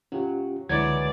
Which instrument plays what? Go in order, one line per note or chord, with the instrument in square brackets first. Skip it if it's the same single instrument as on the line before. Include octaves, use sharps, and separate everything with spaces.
[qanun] F#3 [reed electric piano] C#4 F4 G4
[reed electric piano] C#2 D3 G#6 [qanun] E3 F#3 [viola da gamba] G#3 D5